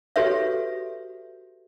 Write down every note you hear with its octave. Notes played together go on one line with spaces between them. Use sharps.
F#4 G4 A4 B4 C#5 E5